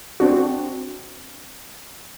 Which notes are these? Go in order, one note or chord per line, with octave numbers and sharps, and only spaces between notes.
C4 D4 F#4